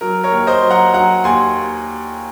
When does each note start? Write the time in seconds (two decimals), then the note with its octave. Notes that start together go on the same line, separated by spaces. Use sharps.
0.01 F#3 A#4
0.24 A#4 C#5
0.32 D#2
0.47 C5 D#5
0.62 F#3
0.70 F#5 A#5
0.94 F#3 F#5 A#5
1.24 D#2 G#5 C6